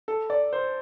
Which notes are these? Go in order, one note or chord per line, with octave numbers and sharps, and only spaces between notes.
A4
D5
C5